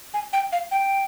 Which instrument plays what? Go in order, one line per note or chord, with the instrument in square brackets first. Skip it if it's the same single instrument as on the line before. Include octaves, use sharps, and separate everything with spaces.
[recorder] G#5
G5
F5
G5